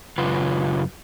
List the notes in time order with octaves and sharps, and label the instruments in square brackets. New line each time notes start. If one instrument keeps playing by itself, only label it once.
[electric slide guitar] F#2 C#3 F4 B4